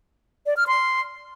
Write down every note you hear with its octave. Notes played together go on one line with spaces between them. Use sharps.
D5
F6
C6